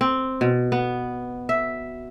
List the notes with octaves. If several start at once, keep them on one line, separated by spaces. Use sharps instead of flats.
C4
B2
B3
E5